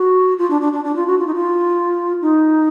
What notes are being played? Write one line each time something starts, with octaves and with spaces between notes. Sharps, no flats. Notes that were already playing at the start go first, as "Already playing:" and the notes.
Already playing: F#4
F4
D4
D4
D4
D4
F4
F#4
F4
D#4
F4
D#4